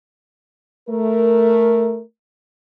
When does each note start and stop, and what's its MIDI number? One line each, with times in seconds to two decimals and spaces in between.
0.89 2.01 57
0.89 2.01 70